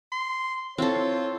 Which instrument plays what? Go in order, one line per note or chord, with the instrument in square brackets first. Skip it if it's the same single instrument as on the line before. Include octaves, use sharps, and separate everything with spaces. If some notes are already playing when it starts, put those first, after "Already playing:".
[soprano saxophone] C6
[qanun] C4 A4 [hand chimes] E4 E6 [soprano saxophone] F4 [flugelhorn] C#5